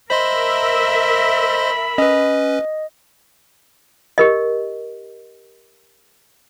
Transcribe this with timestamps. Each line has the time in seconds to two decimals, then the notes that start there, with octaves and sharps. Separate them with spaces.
0.10 A#4 C5 D#5 E5 B5 C6
1.98 C#4 B4 D#5
4.18 G4 A#4 D#5